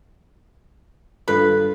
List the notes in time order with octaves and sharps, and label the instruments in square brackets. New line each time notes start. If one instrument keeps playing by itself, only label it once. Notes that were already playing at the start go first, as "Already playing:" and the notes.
[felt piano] G2 F4 [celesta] A4 [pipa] B4